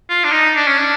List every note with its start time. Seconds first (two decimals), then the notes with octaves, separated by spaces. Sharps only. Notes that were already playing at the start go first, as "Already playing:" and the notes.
0.09 F4
0.24 D4
0.32 D#4
0.56 D4
0.67 C#4
0.79 D4